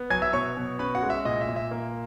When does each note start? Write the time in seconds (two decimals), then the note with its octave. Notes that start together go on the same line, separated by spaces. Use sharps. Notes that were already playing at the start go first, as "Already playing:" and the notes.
Already playing: B3
0.10 F#3 G#5 G#6
0.22 E5 E6
0.33 B2 C#5 C#6
0.57 B2
0.79 C#4 B4 B5
0.95 F#4 F#5
1.03 G#3
1.10 E5
1.25 A#2 D#5
1.41 E5
1.48 A#2
1.56 E5
1.71 A#3